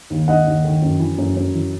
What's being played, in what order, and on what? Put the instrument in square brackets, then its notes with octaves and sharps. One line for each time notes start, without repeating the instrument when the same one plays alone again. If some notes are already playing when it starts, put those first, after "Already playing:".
[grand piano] D#2
D#2 D#5 F#5
D#2
D#3
F#2
E3
F#2
F#2
E3